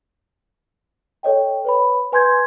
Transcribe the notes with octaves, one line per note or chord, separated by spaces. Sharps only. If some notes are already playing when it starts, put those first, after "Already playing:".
A4 C#5 D#5 G5
B4 C#5 B5
B4 G#5 C6 G6 G#6